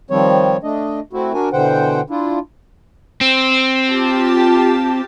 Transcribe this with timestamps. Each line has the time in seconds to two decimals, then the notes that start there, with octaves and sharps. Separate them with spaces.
0.11 D#3 F3 G3 C4 C#5
0.63 A3 D4 D#5
1.13 A3 C4 E4 F#4
1.34 D4 F#4 A#4 G#5
1.53 B2 D3 E3 C5 F#5 G5
2.10 D4 E4 F4
3.21 C4
3.90 F4 G4 A5